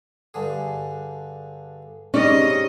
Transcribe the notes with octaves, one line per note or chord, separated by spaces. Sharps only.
G2 D3 G#4
G#2 C3 G3 C#4 D#5